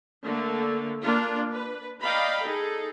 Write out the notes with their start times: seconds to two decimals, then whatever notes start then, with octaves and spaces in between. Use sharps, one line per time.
0.25 D3 A3 A#3
1.03 A#3 D4 F4
1.52 B4
2.01 D5 D#5 F5 G5 A#5 B5
2.42 D#4 G#4 A4